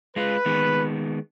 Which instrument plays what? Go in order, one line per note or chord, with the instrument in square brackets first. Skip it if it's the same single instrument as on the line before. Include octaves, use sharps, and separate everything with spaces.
[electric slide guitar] G#3 F4 [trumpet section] B4
[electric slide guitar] D#3 G#3 B3